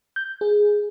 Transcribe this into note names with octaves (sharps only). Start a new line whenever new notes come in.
G6
G#4